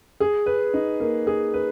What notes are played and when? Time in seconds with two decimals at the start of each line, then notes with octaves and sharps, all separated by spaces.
0.20 G#4
0.46 B4
0.74 D#4
1.00 A#3
1.27 G#4
1.54 B4